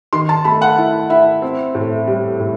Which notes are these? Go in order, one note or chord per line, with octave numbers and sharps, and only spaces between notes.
D#3 C6
A5
A3 B5
F#5
E4
E4 E5
C4
A2
G3
A2